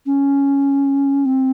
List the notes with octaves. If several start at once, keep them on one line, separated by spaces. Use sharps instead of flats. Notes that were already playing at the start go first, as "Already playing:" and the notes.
C#4
C4